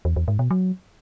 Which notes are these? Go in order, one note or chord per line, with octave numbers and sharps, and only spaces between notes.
E2
E2
G#2
B2
F#3